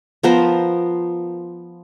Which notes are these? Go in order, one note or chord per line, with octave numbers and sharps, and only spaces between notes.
F3 B3 A#4 C5